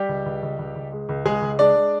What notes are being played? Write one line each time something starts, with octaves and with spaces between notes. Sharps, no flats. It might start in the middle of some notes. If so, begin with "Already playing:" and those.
Already playing: G3 G4
C#2
C#2
C#2
C#2
C#2
G#3
C#2
C#2 G#3 G#4
C#2
G#3 D4 D5
G#3